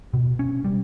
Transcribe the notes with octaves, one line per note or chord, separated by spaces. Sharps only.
B2
C#4
G3